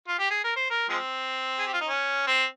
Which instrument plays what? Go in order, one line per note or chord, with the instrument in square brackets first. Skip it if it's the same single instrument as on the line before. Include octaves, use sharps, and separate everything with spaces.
[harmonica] F4
G4
G#4
A#4
C5
A#4
F3 G#3 C4
G#4
G4
F4
D#4
C#4
C4